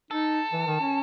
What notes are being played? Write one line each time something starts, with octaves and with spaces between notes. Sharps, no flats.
D#4 A4
E3
D#3
C#4